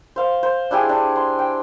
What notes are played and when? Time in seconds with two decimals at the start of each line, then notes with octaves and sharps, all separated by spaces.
0.16 C5 F5
0.43 C5
0.71 D4 E4 G4 G#4
0.89 D4
1.16 C6
1.39 G5